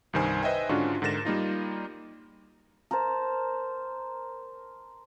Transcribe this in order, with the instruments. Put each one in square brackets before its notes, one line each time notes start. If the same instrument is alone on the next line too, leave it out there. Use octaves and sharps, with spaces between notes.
[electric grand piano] C2 G2 D#3 C5 G#5 C6
B4 C5 D#5 E5 G5 G#5
G#2 D3 C#4 D4 F4 F#4
G#2 D3 A#4 A6 A#6 E7
G3 A#3 D#4 F4
[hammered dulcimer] A#4 C5 A5